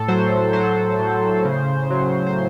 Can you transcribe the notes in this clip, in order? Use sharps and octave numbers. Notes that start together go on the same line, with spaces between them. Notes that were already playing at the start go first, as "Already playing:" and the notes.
Already playing: A2 A4
F#3 C5
F#3 C5
A2
C#3
F#3
C5